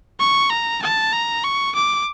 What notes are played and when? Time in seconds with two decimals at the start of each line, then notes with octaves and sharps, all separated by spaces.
0.20 C#6
0.50 A#5
0.82 A5
1.13 A#5
1.44 C#6
1.75 D6